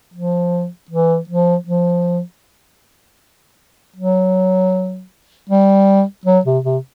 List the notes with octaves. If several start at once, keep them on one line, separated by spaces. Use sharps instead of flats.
F3
E3
F3
F3
F#3
G3
F#3
C3
C3